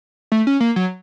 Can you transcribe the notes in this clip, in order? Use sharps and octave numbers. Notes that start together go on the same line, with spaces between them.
A3
C#4
A#3
F#3